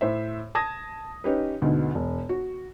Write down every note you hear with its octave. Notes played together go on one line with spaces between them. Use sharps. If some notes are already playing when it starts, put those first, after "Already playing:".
A2 C5 E5
A5 D#6 G#6 A#6
C#4 D#4 G4 B4
D2 G#2 B2 D3
E1
F#4